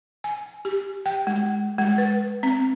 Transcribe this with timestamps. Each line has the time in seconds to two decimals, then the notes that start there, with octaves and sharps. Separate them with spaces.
0.24 G#5
0.65 G4
1.06 G5
1.27 G#3
1.79 G#3
1.98 B4
2.43 C4